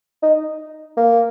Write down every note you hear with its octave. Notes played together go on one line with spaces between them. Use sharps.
D#4
A#3